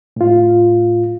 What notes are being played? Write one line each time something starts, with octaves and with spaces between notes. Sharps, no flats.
A2 F4